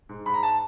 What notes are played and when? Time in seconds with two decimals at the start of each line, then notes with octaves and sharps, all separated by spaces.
0.09 G#2
0.26 G#2 B5
0.34 A#5
0.43 A5